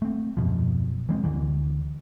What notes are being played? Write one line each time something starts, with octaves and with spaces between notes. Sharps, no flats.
A3 C4
D#1 F#2 B2 F3
E3 G#3 C4
D2 D3 E3